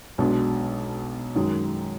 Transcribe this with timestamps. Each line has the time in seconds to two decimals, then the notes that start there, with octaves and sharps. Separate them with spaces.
0.18 B1 B2 G#3 D4
1.35 F#2 D#3 G#3